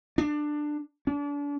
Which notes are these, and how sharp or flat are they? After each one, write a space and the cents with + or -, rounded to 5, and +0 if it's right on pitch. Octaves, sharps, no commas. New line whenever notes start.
D4 +15
D4 -35